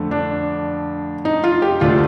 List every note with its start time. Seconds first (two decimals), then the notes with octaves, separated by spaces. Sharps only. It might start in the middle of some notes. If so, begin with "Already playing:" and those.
Already playing: F2 D3 A3
0.11 D4
1.25 D#4
1.44 F4
1.62 G4
1.81 D2 D3 A3 D4 F4